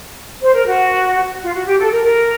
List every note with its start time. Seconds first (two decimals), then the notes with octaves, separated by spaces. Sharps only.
0.42 C5
0.54 A#4
0.67 F#4
1.42 F4
1.54 F#4
1.66 G4
1.79 A4
1.91 A#4
2.04 A#4